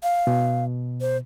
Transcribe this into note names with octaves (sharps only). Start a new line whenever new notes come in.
F5
B2
C5